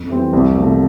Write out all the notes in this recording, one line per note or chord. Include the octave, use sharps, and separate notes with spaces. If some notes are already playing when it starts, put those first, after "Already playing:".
Already playing: F2
E3 G3 C4
C2
C3 F3 A3